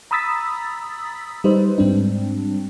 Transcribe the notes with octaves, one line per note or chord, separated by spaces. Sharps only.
A#5 B5 D#6 E6 A6 B6
G3 D#4 B4 C5
G#2 G3 C4 D4